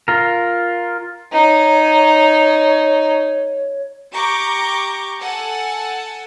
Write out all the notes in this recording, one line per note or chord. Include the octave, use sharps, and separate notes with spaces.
F4 A#4
D#4 C#5
G4 A#5 C#6 D6 G6
A4 F#5 G#5 A5